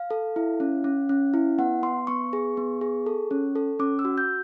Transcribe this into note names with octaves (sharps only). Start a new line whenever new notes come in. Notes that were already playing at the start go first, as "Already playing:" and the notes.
Already playing: F5
A4
E4
C#4
C#4
C#4
E4
B3 F#5
B3 C6
B3 C#6
G#4
B3
G#4
A4
C#4
A4
C#4 D6
E6
F#4
G6